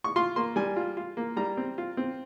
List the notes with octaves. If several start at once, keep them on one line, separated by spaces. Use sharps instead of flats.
C#6
F4 C6
A#3 C6
G3 G#5
F4
F4
A#3
G3 A#5
C4
F4
C4